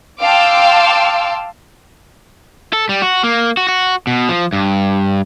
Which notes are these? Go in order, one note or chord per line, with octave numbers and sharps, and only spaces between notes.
F5 G5 A5 C6 D6 E6
A4
G3
F#4
A#3
F#4
F#4
B2
F3
G2